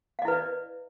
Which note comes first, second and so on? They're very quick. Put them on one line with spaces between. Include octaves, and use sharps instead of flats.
F5 D#5 E4 B4 D5